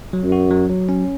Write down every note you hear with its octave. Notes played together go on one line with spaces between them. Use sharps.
F#3
F#2
F#4
F#3
F#3
C#4